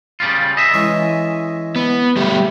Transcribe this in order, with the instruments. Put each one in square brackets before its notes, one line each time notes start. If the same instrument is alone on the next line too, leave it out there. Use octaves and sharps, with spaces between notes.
[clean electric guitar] C#3 G3 F4
D#5 E5
[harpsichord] E3 G#3 C#4
[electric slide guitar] B3
G3 A3 G4